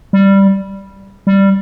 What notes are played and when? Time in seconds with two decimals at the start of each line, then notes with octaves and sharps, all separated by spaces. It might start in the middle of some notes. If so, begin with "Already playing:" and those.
0.13 G3
1.27 G3